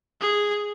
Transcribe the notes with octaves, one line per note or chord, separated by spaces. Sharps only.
G#4